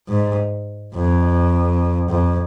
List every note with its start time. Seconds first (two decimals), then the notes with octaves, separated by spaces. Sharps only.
0.08 G#2
0.95 F2
2.10 F2